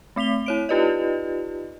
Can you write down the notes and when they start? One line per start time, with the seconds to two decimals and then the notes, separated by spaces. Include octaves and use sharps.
0.16 A3 C4 B6 F7 G7
0.46 E4 C#5 D7
0.69 D#4 F4 G4 B4 D5 D#5